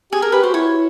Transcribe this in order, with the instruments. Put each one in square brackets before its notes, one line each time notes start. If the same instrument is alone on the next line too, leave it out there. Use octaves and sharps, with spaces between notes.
[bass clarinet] G4 [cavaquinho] G#4
[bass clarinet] G#4 [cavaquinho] A#4
[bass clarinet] G4 [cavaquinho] B4
[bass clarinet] F#4 [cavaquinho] C5
[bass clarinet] E4 [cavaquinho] C#5